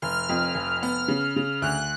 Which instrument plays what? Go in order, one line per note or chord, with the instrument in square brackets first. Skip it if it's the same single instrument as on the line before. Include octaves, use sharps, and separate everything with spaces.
[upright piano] F1 [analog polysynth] F6
[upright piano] F2
F1
[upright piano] B3 [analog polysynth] F6
[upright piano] C#3
C#3
[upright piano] D2 [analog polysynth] F#6